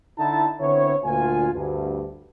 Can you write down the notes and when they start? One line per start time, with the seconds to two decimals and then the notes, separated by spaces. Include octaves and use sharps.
0.18 D3 D#4 E4 A5
0.61 D3 B3 C4 E4 C#5
1.04 D2 A#2 F4 G#5
1.54 D2 G2